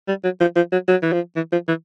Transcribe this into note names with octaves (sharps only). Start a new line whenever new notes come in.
G3
F#3
F3
F3
F#3
F#3
E3
F3
E3
F3
E3